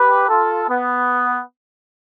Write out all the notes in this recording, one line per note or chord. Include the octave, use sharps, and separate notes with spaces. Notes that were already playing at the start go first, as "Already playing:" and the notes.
Already playing: G4 B4
F4 A4
B3